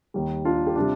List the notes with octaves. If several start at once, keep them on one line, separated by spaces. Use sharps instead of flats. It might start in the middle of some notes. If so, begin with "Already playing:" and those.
D#2 D#3 G3
D4 F4
G4
C3 G3 D4 F4